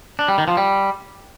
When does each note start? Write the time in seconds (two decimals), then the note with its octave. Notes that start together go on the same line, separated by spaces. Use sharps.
0.19 D4
0.28 G3
0.38 D#3
0.48 F3
0.57 G3